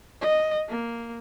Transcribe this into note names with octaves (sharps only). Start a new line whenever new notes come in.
D#5
A#3